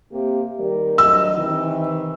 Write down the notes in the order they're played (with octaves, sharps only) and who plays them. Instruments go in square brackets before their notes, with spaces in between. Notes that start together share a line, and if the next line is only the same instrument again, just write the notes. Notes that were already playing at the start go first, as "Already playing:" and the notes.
[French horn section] C3 A#3 G4
D#3 G3 A#4
[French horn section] D2 F#3 D#5 [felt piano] E6
[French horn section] C3 D#3 E3